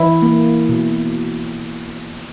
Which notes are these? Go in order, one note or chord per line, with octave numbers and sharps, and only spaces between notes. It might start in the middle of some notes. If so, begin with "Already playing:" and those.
Already playing: E3 E4
A#3
B2